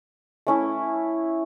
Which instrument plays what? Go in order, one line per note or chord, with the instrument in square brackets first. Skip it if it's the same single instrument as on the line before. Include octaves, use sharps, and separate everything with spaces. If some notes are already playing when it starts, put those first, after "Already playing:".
[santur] A3 C#4 E4